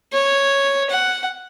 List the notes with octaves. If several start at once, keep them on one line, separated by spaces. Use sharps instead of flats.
C#5
F#5